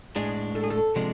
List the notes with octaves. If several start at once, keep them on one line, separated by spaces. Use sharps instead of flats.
A2 G#3 D4 G#4
A4
G#4
A4
C3 F3 G#3 D4